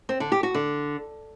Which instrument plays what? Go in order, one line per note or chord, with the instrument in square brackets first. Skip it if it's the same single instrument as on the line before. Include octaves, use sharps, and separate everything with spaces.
[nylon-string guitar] C4
D3
G4
F#4
D3